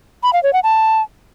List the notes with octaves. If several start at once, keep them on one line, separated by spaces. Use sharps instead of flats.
B5
F5
C#5
F#5
A5